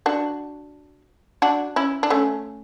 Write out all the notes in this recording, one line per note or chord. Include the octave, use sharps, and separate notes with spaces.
D4 F#4
D4 F#4
C#4 E4
D4
A3 C#4